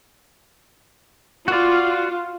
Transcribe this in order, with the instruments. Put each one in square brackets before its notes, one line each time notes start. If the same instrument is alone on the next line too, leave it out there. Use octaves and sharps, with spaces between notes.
[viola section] F4 [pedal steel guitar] F#4 D5